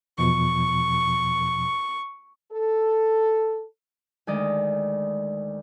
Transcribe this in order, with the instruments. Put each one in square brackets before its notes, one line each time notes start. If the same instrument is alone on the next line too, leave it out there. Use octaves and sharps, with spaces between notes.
[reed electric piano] E2 B2 F3 [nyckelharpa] C#6
[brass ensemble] A4
[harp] D2 D3 D#3 G#3 D5 D#5